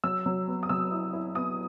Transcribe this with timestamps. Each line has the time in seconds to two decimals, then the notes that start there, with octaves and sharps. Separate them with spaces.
0.04 F#3 E6
0.26 F#3
0.48 B3
0.63 D#6
0.69 F#3 E6
0.92 E4
1.13 E4
1.35 B3 D#6